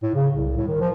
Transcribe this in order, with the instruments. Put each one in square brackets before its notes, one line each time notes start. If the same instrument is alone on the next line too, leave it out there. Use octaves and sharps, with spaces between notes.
[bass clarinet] A2
C#3
C2
A2
D#3
F3